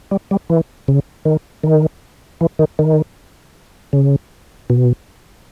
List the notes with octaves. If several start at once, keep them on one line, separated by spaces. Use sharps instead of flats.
G3
G3
E3
C#3
D#3
D#3
E3
D#3
D#3
C#3
B2